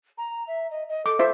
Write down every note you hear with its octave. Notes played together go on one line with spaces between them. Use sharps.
A#5
E5
D#5
D#5
A4 D6
F4 C5 E5